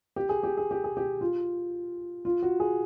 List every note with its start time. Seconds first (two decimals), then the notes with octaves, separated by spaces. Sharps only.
0.16 G4
0.29 G#4
0.43 G4
0.57 G#4
0.71 G4
0.84 G#4
0.97 G4
1.21 F4
2.25 F4
2.43 F#4
2.60 G#4